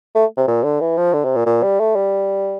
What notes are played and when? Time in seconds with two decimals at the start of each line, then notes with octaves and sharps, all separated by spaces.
0.15 A3
0.37 C3
0.47 A#2
0.64 D3
0.80 E3
0.97 F3
1.13 D3
1.25 C3
1.35 A#2
1.46 A#2
1.63 G3
1.80 A3
1.96 G3